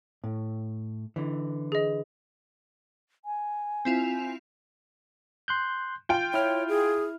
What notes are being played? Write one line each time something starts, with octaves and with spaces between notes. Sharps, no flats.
A2
D3 E3
G#4 D#5
G#5
C4 E4 F4
C6 F#6 G6
F4 G5 G6
E4 C#5 F6
G#4